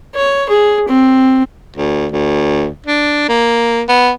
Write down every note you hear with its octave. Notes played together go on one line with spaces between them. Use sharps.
C#5
G#4
C4
D2
D2
D4
A#3
B3